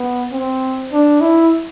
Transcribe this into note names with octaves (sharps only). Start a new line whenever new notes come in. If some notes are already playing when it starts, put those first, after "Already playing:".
Already playing: B3
C4
D4
E4